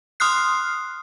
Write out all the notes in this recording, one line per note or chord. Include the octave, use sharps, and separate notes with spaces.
C6 D#6 F6 F#6 C7